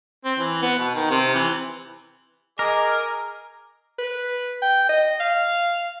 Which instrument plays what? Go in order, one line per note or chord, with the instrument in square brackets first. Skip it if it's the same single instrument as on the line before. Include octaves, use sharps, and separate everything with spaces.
[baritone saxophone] C4
E3
B3
B2
D#3
C3
E3
[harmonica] G#4 D#5 D6 [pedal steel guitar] A#4
[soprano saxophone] B4
G5
D#5
F5